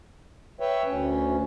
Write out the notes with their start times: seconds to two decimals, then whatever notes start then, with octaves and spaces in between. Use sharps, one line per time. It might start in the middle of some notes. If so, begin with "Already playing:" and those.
0.60 B4 C#5 E5 G5
0.85 D2 C#4